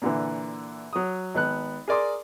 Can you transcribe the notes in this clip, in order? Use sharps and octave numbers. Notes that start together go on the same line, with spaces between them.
A#2 D3 E3
F#3 D#6
G#1 B3 F#6
G#4 A#4 D5 C6 D6